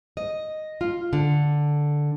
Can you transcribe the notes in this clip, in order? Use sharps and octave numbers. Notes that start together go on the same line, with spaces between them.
D#5
F4
D3